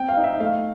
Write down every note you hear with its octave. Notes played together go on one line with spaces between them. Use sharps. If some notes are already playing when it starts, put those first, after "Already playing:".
Already playing: C4 G5
F5
D#4
E5
A3 F5